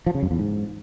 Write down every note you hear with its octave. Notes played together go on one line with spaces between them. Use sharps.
F3
C#3
F#2
E2
G#2